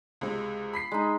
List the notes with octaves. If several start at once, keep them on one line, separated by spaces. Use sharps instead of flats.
C#2 C3 G#3
B5 B6 C7
G#3 D#4